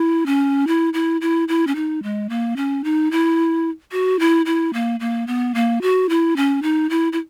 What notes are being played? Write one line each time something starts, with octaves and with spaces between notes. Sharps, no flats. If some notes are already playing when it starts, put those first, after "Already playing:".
Already playing: E4
C#4
E4
E4
E4
E4
C#4
D#4
G#3
A#3
C#4
D#4
E4
F#4
E4
E4
A#3
A#3
B3
A#3
F#4
E4
C#4
D#4
E4
E4